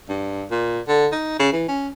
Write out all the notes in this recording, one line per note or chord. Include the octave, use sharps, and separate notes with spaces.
G2
A#2
D3
D#4
C#3
E3
C#4